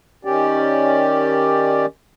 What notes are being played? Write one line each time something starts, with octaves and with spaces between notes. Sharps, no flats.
D#3 C#4 G4 D5